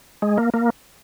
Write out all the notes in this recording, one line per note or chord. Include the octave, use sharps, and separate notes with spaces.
G#3
A#3
A#3